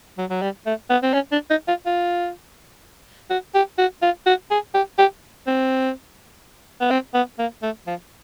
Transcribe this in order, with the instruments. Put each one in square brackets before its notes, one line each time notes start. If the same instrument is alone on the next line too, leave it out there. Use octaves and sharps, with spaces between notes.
[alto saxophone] F#3
F#3
G3
A3
B3
C4
C#4
D4
D#4
F4
F4
F#4
G4
F#4
F4
F#4
G#4
G4
G4
C4
B3
C4
B3
A#3
A3
F3